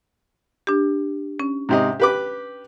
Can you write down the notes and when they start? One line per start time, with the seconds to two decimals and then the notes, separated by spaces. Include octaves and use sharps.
0.67 D4 G4
1.40 C#4
1.69 G#2 C3 D#5
2.00 G4 B4 D6